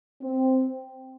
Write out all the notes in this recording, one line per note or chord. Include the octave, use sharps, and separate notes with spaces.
C4